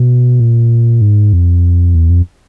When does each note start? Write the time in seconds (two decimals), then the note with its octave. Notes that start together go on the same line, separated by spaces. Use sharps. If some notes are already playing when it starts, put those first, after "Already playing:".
Already playing: B2
0.40 A#2
1.01 G#2
1.33 F2
1.95 E2
2.10 F2